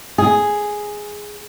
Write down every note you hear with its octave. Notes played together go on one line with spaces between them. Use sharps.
G#4